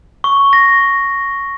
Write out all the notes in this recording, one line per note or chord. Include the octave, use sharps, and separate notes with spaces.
C#6
A#6